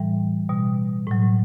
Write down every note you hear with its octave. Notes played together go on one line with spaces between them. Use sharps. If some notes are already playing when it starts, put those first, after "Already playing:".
Already playing: A2 E3 G3
B2 G3
A2 F#3